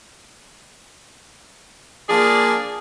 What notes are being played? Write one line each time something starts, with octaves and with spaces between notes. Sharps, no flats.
F3 A#3 D4 G#4 A#4 D5